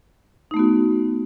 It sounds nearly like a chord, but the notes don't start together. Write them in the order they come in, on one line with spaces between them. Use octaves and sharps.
D#4 A3 B3 F#4